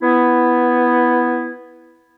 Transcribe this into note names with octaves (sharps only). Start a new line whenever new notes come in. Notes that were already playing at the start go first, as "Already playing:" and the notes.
B3 E4